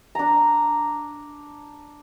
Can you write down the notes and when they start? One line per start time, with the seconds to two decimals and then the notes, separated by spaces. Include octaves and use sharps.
0.15 D4 A#5